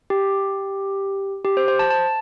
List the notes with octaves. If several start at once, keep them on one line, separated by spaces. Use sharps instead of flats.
G4
G4
C5
C5
A5
A5